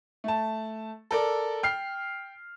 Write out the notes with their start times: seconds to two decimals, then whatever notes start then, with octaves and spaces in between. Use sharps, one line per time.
0.24 A3 A5
1.11 A4 A#4 D5
1.63 G5 F6 C7